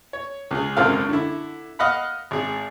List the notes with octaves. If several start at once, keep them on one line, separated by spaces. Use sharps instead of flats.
C#5
C#2 G#4
G#1 C#2 F#2 C4 A4 F5
D3 E4
D#5 F5 F#5 B5
G#1 G#4